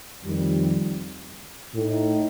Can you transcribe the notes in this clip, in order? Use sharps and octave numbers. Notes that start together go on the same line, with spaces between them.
F2 D#3 G3
A2 A3 D#4